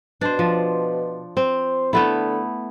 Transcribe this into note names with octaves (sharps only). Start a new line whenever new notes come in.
B2 D4 C5
F3
C4 C5
D3 A3 B3 E4